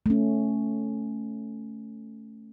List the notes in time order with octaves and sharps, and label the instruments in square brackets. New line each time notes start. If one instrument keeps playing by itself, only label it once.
[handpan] A3 C#4